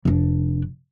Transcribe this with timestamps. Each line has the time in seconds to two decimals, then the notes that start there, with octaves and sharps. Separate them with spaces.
0.05 F1 D4